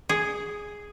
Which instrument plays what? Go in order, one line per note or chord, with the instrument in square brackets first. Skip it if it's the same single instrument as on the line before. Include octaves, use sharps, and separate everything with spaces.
[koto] G#4